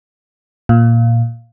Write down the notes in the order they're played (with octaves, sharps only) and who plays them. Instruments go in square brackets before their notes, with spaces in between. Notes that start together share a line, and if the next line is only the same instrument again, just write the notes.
[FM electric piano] A#2